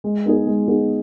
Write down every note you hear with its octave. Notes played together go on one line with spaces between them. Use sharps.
G#3
B3 D#4 G#4
G#3
B3 D#4 G#4